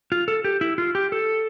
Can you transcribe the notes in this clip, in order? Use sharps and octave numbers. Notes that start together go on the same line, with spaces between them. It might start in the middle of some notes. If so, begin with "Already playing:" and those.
F4
A4
G4
E4
F4
G4
A4